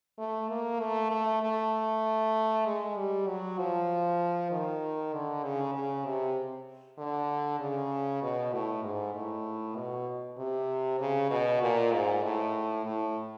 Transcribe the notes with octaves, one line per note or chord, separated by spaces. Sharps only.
A3
A#3
A3
A3
A3
G#3
G3
F#3
F3
D#3
D3
C#3
C#3
C3
D3
C#3
B2
A2
G#2
A2
B2
C3
C#3
B2
A#2
G#2
A2
A2